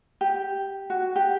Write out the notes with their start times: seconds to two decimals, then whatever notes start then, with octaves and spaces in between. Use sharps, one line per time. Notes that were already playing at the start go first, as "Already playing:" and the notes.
0.21 G4
0.90 F#4
1.16 G4